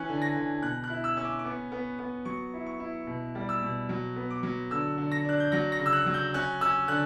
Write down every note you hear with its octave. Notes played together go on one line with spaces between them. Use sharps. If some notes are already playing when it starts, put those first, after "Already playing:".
Already playing: E3 C#4 F#6
D3
A#6
D3
B2 F#6
F#6
E4
E6
C#4 E6
D6
D6
B3 C#6
B3
B3
F#3 C#6
E4
C#6
E4
B2
G3
E6
B2
F#3
B3
D6
F#3
D3 E6
D3
A#6
D4 F#6
G6
F#3 A#6
A#6
C#3
E6
F#6
F#3
G6
C#4 F#6
C#4 E6
D3 F#6